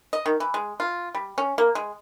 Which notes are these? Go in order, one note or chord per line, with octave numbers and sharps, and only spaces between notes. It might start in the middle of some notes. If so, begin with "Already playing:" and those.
D#5
D#3
E3
G#3
F4
G3
C#4
A#3
G#3